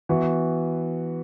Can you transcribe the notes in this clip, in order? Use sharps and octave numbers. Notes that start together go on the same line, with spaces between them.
E3 B3 F#4